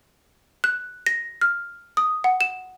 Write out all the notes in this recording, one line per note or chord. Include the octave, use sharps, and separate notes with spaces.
F#6
A#6
F6
D#6
F#5
E7